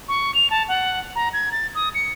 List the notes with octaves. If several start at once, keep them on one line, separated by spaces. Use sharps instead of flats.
C#6
F7
A5
F#5
A#5
G#6
A6
D#6
C#7